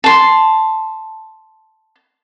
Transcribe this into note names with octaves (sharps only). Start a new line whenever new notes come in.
A5 C6